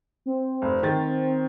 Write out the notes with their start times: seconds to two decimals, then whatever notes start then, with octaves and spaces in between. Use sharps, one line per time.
0.26 C4
0.62 F1
0.83 D#3 A6